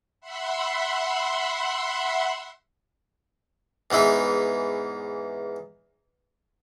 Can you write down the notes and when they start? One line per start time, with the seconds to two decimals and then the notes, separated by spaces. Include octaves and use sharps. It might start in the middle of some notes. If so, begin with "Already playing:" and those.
0.21 E5 F#5 B5 C6
3.91 E2 G#2 E3 E4